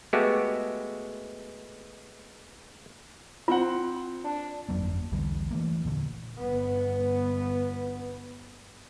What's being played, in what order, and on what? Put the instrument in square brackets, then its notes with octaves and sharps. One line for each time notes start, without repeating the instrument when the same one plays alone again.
[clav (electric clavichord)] G#3 A3 B3 F#4 G4
[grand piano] C4 F#5 [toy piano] F4
[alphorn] D4
[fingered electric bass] G1 F2 F#3 A#3
B1 E2 D3 G3
E3 A3 A#3
E1 A#2 D3
[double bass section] G1 B3